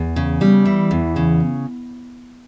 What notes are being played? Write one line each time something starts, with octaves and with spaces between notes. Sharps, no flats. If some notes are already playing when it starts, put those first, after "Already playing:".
Already playing: E2
C#3
G3
E3
E2
C#3